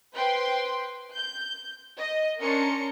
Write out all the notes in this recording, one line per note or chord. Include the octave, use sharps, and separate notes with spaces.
B4 C5 G5 C6
G6
D#5
C#4 D4 A#4 C6 C#7